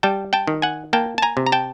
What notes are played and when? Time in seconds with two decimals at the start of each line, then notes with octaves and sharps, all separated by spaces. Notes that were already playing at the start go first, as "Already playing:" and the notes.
0.03 G3 G5 A5
0.33 G5 A5
0.47 D#3
0.62 F#5 G#5
0.93 A#3 G5 A5
1.18 A5
1.22 G#5 A#5
1.37 C3
1.47 A#5
1.52 G5 A5